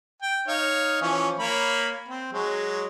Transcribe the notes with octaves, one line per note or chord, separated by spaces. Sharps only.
G5
D#4 C#5 F5
E3 F3 C#4
A#3 C#5 B5
C4
F#3 G#3